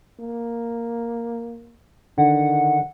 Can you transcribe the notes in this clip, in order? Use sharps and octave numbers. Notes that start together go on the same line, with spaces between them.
A#3
D3 D#3 F#5